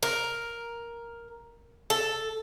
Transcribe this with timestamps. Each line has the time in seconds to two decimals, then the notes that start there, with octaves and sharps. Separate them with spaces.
0.03 A#4
1.90 A4